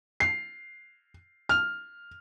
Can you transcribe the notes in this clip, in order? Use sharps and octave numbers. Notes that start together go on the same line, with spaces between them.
C7
F6